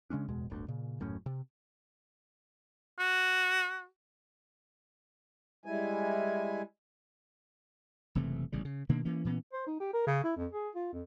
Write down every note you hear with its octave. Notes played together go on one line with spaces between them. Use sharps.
C#3 G#3 C#4 D4
D1 E2 B2 G#3
D1 G1 D2
A#2 C#3
D#1 F#2 A2 C#4
C3
F#4
G3 G#3 E4 G#5
F#1 C3 E3 A3
A1 C#3 G3
C#3
B2 D#3 A#3 D4
E3 A#3 C#4
A#2 E3 B3 C#4
C5
D#4
G4
A#4
C#3
E4
F2
G#4
F4
F2